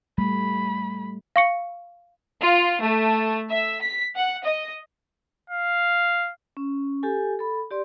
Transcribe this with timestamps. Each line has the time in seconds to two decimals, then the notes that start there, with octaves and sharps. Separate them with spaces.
0.18 G3 A3 B5
1.36 F5 C#6 C#7
2.41 F4
2.81 A3
3.49 E5
3.81 B6
4.16 F#5
4.44 D#5
5.50 F5
6.57 C#4
7.03 G4 A4 G#5
7.39 A4 B5
7.71 G4 D5 C6